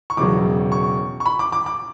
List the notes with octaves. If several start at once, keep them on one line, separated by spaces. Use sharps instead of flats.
C#6
E1 E2 C#3 F#3 D6
C#6
C#6
B5
D6
D6
D6